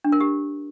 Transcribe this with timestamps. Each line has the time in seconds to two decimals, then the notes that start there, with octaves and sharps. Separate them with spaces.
0.04 D4
0.12 A#4
0.20 G4